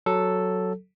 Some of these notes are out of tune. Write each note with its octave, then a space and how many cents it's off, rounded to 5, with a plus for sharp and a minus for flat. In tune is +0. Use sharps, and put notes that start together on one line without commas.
F#3 +0 A4 +0